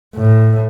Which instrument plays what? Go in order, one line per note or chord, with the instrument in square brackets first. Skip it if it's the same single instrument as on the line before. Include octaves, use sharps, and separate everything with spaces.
[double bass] A2